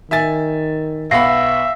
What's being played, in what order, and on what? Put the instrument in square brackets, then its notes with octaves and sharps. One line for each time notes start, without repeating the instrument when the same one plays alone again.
[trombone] D#3 [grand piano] E5 G#5 A6
[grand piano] B1 B3 B5 [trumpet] E5 [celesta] F5 A#6 C7